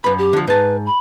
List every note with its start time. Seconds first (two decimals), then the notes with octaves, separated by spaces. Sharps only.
0.04 F#2 B4 B5
0.18 G4
0.33 D3 F3
0.47 G#2 B4 A5
0.86 B5